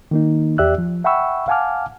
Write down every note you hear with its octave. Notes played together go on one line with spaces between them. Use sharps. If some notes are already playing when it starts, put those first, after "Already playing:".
D#3 A#3 D#4
E2 G4 D5 E5 E6 F#6
F3
E5 F#5 G5 B5 C#6 E6
F5 F#5 G#5 A5 D6 F6